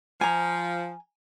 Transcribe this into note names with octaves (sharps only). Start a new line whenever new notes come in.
F3 G#5 A#5